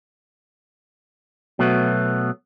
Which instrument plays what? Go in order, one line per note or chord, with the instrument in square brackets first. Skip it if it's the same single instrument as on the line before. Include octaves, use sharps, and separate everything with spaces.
[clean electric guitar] B2 F#3 A3 B3